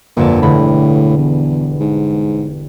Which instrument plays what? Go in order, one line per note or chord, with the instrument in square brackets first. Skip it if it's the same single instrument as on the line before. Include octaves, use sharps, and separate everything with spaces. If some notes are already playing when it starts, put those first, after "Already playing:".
[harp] G1 F2 A5 [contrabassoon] A#2
[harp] E1 D3 B5 [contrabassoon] A2
[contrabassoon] E2
G#2